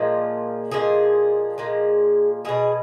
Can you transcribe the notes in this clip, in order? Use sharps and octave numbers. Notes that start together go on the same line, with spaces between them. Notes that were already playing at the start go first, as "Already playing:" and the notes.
Already playing: A#2 F3 G#3
A#2 F3 G#3 G#4
A#2 F3 G#3
B2 G#3 G#4